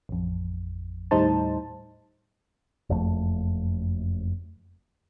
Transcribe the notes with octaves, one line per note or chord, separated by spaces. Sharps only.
A1 F2
D#2 A2 G3 D#4 C5 A5
F#1 F2 A3